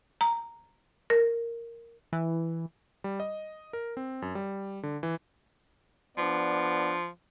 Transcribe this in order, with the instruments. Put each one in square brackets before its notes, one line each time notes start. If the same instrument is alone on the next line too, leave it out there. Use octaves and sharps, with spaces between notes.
[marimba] A#5
A#4
[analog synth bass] E3
[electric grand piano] G3
D#5
A#4
C4
F#2
G3
D3
E3
[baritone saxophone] F3 [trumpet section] B3 D4 D5